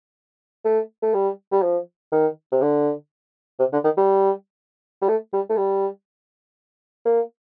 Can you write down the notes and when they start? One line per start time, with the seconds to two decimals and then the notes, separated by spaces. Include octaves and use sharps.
0.65 A3
1.02 A3
1.14 G3
1.52 G3
1.63 F3
2.12 D#3
2.52 C3
2.61 D3
3.59 C3
3.73 D3
3.84 D#3
3.97 G3
5.02 G3
5.08 A3
5.33 G3
5.49 A3
5.57 G3
7.05 A#3